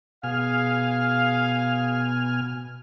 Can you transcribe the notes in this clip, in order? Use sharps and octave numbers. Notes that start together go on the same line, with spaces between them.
B2 G#4 F5 G#5 F6